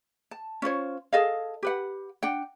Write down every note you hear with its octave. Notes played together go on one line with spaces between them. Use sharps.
A5
C#4 F4 C5 C#5
G#4 A4 D#5 F5
G4 B4 F#5
D4 F#5 G5